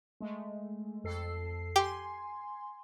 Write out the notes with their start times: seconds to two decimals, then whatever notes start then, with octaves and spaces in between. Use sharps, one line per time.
0.21 G#3 A3
1.04 F2 A4 C7
1.76 G4 G#5 C6